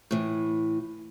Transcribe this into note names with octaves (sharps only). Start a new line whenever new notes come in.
A2 E3